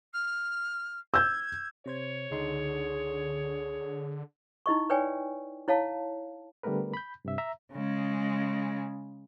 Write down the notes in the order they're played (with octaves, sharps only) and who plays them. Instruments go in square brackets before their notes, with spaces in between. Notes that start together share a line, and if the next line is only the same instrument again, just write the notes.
[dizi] F6
[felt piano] E6 G6 [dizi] G#6
[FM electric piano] C3 C5 G#6 [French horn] C#5
[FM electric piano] C#2 D#4 C6 [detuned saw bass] D3 [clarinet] G#4
[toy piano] D#4 E4 D#5 C#6
B4 C#5 D5 G5 G#5
E4 C#5 F5 A5
[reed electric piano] D3 G3 A3 B3 A#4 B4
B5 G6
G2 C3 E5
E5 A#5
[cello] C#3 G#3